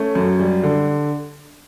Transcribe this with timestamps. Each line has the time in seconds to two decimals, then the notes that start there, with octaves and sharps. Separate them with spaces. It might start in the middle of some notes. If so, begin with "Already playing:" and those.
Already playing: A3 C#4
0.15 F#2
0.39 G3
0.63 D3